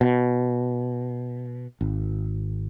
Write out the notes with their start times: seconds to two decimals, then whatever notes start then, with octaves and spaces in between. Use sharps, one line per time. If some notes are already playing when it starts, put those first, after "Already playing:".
0.01 B2
1.81 G#1